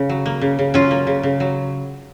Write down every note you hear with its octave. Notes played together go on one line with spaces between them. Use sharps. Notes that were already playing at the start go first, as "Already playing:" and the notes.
Already playing: C#3
F#3
A#3
C#3
C#3
F#3 C#4 F4
A#3
C#3
C#3
F#3